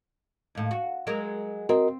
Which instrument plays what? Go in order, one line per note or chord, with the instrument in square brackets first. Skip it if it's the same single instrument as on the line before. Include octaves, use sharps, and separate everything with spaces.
[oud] D#2 A2
F#4
F#3 G#3 A#4
[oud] C4 [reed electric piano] F#4 A#4 D#5